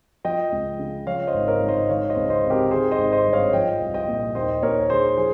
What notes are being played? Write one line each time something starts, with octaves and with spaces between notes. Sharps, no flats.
F3 D#5 G5
C#2
C#3
F3 C#5 F5
C5 D#5
G#1
A#4 C#5
G#2
C5 D#5
D#3 C#5 F5
C5 D#5
C#2
C5 D#5
C3
G4 A#4
D#3 G#4 C5
C5 D#5
G#1
C5 D#5
G2
C#5 F5
F3 D#5 G5
C2
D#5 G5
A#2
D#2 C5 D#5
D#2 A#4 C#5
D#3 G#4 C5
F3 G#4 C5